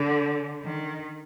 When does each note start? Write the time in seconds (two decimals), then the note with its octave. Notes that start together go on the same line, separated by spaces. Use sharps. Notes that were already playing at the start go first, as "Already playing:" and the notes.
Already playing: D3
0.63 D#3